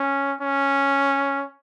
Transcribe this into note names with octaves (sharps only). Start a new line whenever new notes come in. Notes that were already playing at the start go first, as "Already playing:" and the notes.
Already playing: C#4
C#4